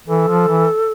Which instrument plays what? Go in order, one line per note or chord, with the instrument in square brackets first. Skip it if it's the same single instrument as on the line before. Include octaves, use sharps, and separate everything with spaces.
[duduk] E3 [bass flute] A4
[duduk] F3
E3